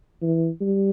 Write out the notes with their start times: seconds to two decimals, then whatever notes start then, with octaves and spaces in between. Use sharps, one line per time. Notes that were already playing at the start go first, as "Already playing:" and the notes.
0.22 E3
0.61 G3